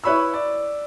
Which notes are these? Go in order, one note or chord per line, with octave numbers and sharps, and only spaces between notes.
E4 B4 C#5 B5 C#6 E6
D5